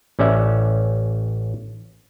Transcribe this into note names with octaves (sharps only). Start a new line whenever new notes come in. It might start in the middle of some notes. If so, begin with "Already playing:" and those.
A1 C#4 D5 E5